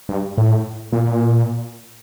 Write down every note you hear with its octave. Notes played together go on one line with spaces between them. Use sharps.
G2
A2
A#2